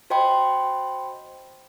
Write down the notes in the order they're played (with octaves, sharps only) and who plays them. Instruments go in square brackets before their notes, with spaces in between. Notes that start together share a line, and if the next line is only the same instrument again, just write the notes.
[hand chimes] F#4 C5 D#5 G5 B5 C6